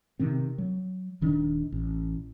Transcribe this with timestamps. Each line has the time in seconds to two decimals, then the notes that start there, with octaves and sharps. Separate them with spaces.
0.19 C3 D#3 C4
0.58 F#3
1.21 D#1 D#3 D4
1.72 A1